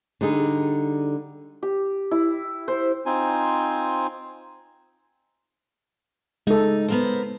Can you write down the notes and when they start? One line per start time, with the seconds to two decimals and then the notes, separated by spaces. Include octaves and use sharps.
0.21 D3 G3 D#4 G#4
1.63 G4
2.11 E4
2.68 C5
3.06 C4 D#4 F4 C5 G#5
6.47 G#3 D#4 A4
6.88 B3 A#4 C5